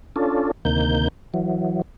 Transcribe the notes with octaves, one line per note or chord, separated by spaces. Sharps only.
C#4 D4 F4 A4
D2 C3 D#3 A#3 G6
E3 F#3